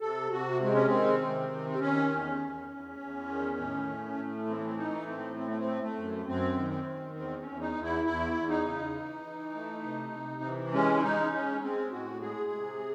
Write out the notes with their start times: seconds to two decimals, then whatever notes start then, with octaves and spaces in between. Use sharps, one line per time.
0.01 C3 A4
0.31 C3 F#4
0.61 G#3 C4
0.74 C#4
0.86 D#3 C4
1.20 C3
1.50 D#3
1.69 C4
1.80 D#3 C#4
2.09 E2
2.39 E2
2.69 E2
2.99 E2
3.28 D#3
3.58 A2
3.88 A3
4.18 A2
4.47 E3 C4
4.57 A3
4.65 C4
4.77 A3 D#4
5.07 A2 C4
5.36 A3 C4
5.48 A3
5.58 C4
5.66 A3
5.82 A3
5.96 F#2
6.25 F#2 C4
6.56 D#3
6.70 C4
6.85 D#3
7.15 E2 C4
7.38 C#4
7.45 E2
7.60 D#4
7.74 E2
7.82 E4
8.04 E2 E4
8.34 E2
8.49 D#4
8.64 C#3
8.93 E3
9.24 E3
9.54 A3
9.83 C3
10.12 C3
10.42 E3
10.72 G#3 C#4
10.97 E4
11.02 G#3 D#4
11.31 G#3 C#4
11.61 G#3 C4
11.91 A2 F#4
12.21 G#3 G#4
12.51 C3